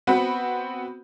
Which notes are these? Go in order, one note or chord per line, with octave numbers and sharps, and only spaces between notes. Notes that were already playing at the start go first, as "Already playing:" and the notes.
B3 C4 F#4 B4 F#5